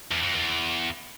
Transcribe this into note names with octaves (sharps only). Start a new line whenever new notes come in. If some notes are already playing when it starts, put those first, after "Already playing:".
E2
F2
E2